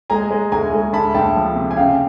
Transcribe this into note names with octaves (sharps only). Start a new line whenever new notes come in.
G#3 G#5 A#5
G#3
D2 G#5 A#5
G#3
D2 A5 B5
D2 G5 A5
F3
C3
G#5
C#3 F5 G5